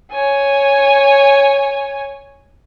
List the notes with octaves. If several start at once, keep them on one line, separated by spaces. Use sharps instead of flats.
C#5 G#5